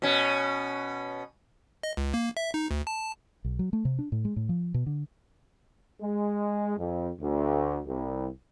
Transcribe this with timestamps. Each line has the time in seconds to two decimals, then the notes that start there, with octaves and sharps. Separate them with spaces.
0.02 B2 C#4
1.83 D#5
1.97 C#2
2.14 A#3
2.37 E5
2.54 D#4
2.71 D2
2.87 A5
3.45 B1
3.59 F#3
3.73 A3
3.85 C3
3.99 D4
4.12 A2
4.25 G#3
4.36 A2
4.49 F3
4.74 B2
4.86 D3
6.01 G#3
6.77 F2
7.20 D2
7.87 C2